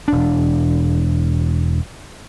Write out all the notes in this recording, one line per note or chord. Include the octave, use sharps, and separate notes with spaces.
E1 D4